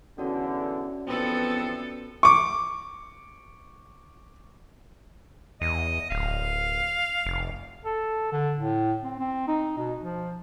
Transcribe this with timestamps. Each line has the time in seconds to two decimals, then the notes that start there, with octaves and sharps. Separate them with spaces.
0.18 E2 D3 C#4 F#4 D5
1.07 E2 F3 B3 C4 A4
2.23 C#6 D6
5.61 E2 D#5
6.10 D1 F5
7.26 F1
7.85 A4
8.32 D3
8.58 A2
9.03 C4
9.19 C4
9.48 D#4
9.78 B2
9.99 F3